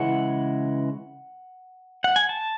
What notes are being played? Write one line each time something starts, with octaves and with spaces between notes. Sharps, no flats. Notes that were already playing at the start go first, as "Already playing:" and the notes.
Already playing: C#3 E3 G#3 C#4 E4 F#5
F#5
G#5
A5